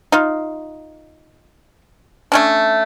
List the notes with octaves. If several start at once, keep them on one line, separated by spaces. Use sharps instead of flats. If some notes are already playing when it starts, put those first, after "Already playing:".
D#4 F4
A3 C#4 D4